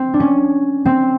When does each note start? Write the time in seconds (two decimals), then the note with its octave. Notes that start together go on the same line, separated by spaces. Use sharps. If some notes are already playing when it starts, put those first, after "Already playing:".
Already playing: C4
0.14 D4
0.20 C#4
0.86 C4